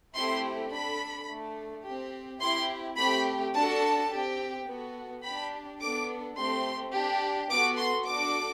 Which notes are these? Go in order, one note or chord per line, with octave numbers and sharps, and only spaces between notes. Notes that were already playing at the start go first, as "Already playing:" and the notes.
A3 C4 E4 G4 C6
D4 A4 B5
A3 D4 A4
C4 G4
C4 E4 G4 C6
A3 C4 G4 B5
D4 F#4 A4 A5
C4 G4
B3 F#4 A4
D4 G4 B5
B3 D4 A4 D6
A3 C4 G4 C6
D4 G4
B3 F#4 A4 D6
C6
D4 F#4 A4 D6